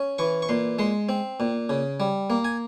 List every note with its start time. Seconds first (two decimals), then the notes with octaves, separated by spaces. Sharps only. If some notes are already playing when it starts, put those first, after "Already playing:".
Already playing: C#4
0.18 E3 C#6
0.42 C#6
0.49 A#2 C6
0.79 G#3 C6
1.09 C4
1.40 A#2
1.69 C#3
2.00 G3
2.30 A#3
2.45 G#5